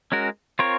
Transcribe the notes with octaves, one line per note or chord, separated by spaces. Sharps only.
G#3 C#4 F#4 A#4
C4 F4 A#4 C#5